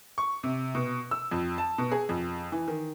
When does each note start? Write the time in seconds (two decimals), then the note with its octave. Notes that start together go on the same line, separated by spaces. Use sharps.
0.18 C#6
0.43 C3
0.75 B2
1.11 E6
1.31 F2
1.58 A5
1.78 B2
1.92 G#4
2.09 F2
2.52 E3
2.68 D#3